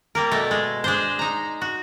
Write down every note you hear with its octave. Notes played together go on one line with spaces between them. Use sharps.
G3 A#3 A#4
B2 A3
G#3
G#3 D4 C5
D#4 A#5
F#4